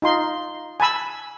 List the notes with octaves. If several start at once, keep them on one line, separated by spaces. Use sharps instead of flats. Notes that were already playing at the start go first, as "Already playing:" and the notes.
D#4 F4 C6
G#5 A5 B5 E6